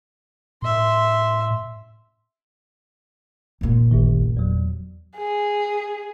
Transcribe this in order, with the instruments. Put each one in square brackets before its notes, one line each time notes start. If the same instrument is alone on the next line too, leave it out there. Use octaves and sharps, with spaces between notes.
[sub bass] A2 [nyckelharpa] E5 C6
[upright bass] F1 A#2
[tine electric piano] A1 F#2 D#3
E2 F#3
[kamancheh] G#4